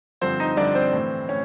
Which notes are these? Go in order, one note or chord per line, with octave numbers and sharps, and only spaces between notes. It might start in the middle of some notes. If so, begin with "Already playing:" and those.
G2 D3 F3 C4 C5
D#4 D#5
G2 D3 F3 D4 D5
C4 C5
A2 E3
A2 C#4 C#5